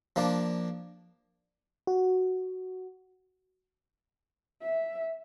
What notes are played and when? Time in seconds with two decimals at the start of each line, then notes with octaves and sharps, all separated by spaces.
0.16 F3 A#3 D4
1.87 F#4
4.62 E5